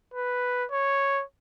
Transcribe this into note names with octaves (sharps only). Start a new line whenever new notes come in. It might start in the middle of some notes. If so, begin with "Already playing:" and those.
B4
C#5